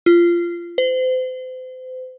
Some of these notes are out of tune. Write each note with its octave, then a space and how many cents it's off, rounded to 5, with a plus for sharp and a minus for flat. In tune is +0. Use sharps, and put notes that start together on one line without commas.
F4 -20
C5 -35